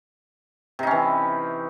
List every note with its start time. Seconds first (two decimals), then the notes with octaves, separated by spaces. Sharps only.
0.79 C3
0.83 D#4
0.87 C#4
0.91 E3